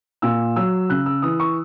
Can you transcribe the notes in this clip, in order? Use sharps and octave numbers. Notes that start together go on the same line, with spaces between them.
A#2 E6
F#3 E6
C#3 F#6
E6
E3 D#6
C#6